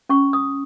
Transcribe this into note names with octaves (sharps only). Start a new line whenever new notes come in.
C#4 C#6
D#6